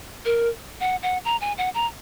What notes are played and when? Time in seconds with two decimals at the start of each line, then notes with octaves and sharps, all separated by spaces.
0.25 A#4
0.81 F#5
1.03 F#5
1.25 A#5
1.41 G#5
1.58 F#5
1.75 A#5